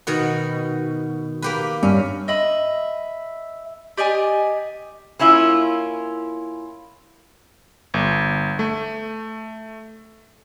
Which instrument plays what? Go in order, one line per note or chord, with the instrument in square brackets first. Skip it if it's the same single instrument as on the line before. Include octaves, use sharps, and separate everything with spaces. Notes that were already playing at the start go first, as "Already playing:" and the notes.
[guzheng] B2 D#3 F#4
A#3 G4 B4
[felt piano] G2 [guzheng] C#4
[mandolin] D#5 E5 B5
G4 D5 D#5 G#5
[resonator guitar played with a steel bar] A#3 C#4 E4 F4
[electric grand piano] G1
A3